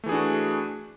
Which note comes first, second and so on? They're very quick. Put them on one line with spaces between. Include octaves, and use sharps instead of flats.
A3 E3 G#4 D4 F#4